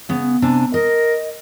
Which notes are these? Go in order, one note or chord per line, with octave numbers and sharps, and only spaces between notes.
C#3 B3
C3 D4 G#5
A#4 D#5